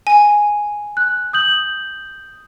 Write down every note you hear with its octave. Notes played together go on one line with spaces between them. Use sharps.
G#5
F#6
D#6 G6 F#7